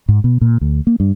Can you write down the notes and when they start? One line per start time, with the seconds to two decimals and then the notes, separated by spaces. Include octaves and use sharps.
0.08 G#2
0.24 B2
0.41 A#2
0.61 D2
0.87 A#3
1.00 G2